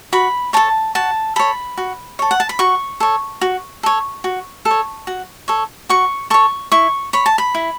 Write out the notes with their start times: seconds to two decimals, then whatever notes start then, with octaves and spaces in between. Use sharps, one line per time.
0.13 F#4 B5
0.53 A4 C#5 A5
0.95 F#4 A5
1.36 A4 C#5 B5
1.77 F#4
2.19 A4 C#5
2.31 F#5
2.40 A5
2.49 B5
2.59 F#4 C#6
3.00 A4 C#5
3.41 F#4
3.83 A4 C#5
4.24 F#4
4.65 A4
4.71 C#5
5.07 F#4
5.48 A4 C#5
5.89 F#4 C#6
6.30 A4 C#5 C#6
6.72 E4 C#6
7.13 C#5 B5
7.26 A5
7.38 B5
7.55 E4